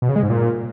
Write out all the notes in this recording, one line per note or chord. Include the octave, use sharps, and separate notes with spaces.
B2
C#3
G#3
G#2
A#2